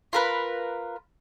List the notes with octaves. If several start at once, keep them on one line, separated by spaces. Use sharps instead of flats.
F4 A#4 B4